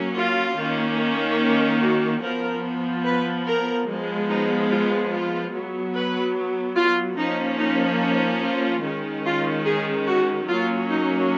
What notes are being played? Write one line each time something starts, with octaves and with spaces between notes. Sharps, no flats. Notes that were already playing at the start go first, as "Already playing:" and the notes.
Already playing: F#3 A#3 C#4
F4
D#3 A#3 C#4
F#4
F3 B3 A#4
B4
A#4
F3 G#3 B3
D#4
F4
F4
F#3 B3
B4
F4
F3 A#3 C#4 D#4
D#4
D#4
F4
D#3 G#3 C#4
F4
G#4
F#4
F#3 A#3 C#4 F4
D#4